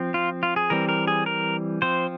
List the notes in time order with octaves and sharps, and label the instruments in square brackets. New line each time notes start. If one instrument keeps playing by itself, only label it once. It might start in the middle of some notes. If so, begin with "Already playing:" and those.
Already playing: [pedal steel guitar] F3 C4
F4
F4
G#4
E3 G3 C4 A#4
A#4
G#4
A#4
F3 C4 C5